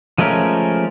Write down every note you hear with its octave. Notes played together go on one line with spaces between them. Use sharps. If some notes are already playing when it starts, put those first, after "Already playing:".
F3 G#3 A3 C#4 A#4